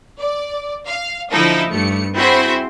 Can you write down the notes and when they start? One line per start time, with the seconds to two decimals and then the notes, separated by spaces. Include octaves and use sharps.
0.19 D5
0.85 F5
1.31 D3 F3 D#4 E4 A4
1.69 G2 A3 C#7
2.14 C4 E4 F#4 G#4 C5 E5